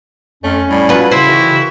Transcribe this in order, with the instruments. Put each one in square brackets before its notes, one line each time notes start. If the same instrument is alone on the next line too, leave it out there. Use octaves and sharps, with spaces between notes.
[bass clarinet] F2 [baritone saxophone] A3 [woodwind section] C#4
[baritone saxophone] A2 [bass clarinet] G3
[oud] F3 F#3 B4
[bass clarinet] C#3 [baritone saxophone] E4 [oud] C5
[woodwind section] D#3 E3 F#4
[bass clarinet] C#3